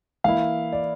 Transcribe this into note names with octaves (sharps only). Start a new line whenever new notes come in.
E3 A#3 E4 F5
D5